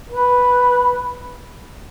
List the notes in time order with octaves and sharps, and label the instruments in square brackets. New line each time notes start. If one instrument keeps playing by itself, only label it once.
[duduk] B4